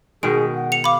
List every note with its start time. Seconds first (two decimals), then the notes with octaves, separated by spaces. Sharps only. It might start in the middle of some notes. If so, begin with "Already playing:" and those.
0.23 B2 D#3 G#3 G#4 D7
0.54 F#5
0.72 C#7 F7
0.84 F5 B5 D6